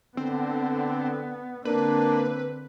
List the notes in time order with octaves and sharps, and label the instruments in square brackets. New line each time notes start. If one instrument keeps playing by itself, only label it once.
[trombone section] D3 [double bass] B3 [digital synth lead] C4
[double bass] D3 C4 [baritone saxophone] A#3 [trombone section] D4 [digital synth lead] B4